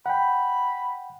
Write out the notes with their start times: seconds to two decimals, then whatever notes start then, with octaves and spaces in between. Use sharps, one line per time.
0.06 F#5 G5 B5